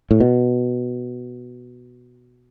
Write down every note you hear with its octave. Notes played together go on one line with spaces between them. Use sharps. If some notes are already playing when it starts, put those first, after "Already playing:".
A2
B2